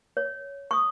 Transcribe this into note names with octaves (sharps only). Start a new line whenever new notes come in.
C#5
C#6 D#6